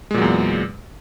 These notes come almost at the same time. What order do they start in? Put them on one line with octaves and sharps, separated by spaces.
G#3 A#2 F#3 E2